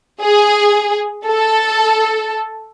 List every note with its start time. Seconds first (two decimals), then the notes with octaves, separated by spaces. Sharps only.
0.21 G#4
1.26 A4